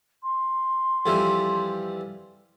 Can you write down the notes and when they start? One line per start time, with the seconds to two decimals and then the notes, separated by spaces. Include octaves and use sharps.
0.22 C6
1.06 F2 E3 G3